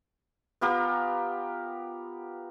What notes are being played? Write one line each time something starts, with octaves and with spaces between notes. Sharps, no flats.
B3 F4 G4 A#4